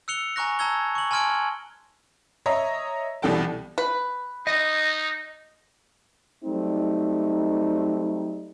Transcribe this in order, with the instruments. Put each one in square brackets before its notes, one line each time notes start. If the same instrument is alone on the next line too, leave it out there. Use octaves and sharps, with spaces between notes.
[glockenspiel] E6 F#6 C#7 F7 G7
G#5 A#5 C#6 F#6 A#6
A5 A#5 E6 G#6 G7
C#6 F#7
G#5 A5 C6 F6 G#6 D7
[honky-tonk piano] C#5 D#5 E5 A#5
C2 B2 E3 A4 G5 A5
[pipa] B4
[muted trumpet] D#4 [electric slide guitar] D#5
[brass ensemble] F#3 G3 A3 C4 D#4